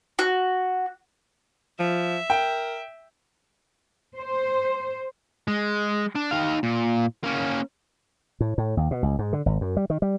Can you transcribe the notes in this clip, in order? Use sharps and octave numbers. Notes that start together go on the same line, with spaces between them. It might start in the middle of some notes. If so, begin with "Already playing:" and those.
F#4
F3 E5
A#4 G5
C5
G#3
D4
D#3 F5
A#2
A#3 C#4
A2
A2
D#2
B2
C#2
G#2
D3
G#1
F#2
G3
D#3
G3